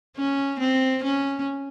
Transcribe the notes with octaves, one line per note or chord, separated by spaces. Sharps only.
C#4
C4
C#4